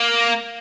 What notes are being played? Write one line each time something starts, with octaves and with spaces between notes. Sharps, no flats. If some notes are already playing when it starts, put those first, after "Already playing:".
Already playing: A#3